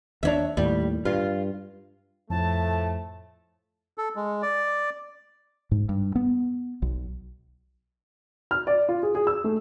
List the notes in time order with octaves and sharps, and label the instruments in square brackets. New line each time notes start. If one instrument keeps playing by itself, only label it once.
[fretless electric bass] D#2 C#4 D4 [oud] C#5 E5
[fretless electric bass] D#2 A2 [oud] G3
[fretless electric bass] G2 [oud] F4
[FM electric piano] F2 [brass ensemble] A2 F3 A3 [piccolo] A5
[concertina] A4
G#3
D5
[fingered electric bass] G#2
G2
B3
B1
[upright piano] F6
D5
F4
G#4
G#4
E6
A3